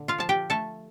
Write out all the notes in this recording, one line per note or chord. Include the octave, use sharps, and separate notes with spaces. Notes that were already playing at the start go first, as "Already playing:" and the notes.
Already playing: A#2 D3
F4 F5
F3 A5
G4 G5
A3 A4 A5